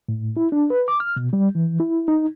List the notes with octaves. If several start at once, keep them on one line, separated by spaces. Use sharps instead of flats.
A2
E4
D4
B4
D6
F6
B2
G3
E3
E4
D#4